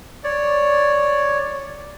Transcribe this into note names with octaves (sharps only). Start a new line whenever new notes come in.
C#5 D5